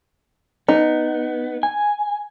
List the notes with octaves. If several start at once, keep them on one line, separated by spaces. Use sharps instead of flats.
B3 D#4
G#5